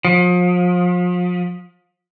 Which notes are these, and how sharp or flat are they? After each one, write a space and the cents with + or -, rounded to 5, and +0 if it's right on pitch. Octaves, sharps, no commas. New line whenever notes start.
F3 +35